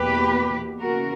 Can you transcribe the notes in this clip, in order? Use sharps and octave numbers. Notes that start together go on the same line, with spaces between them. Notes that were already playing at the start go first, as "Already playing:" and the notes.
Already playing: E2 B2 A#3 G4 B4
C#3 E3 A#3 F#4 A#4